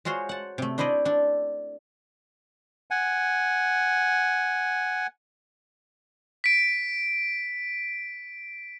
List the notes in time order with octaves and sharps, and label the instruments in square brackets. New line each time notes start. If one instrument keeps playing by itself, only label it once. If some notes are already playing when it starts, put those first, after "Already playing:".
[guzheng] G#3 F4 F#4 C5 C#5
F#5 A5
C3 A3
D4 E4 C5 D5 D#5
D4 A4
[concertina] F#5 G#5
[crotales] B6 D7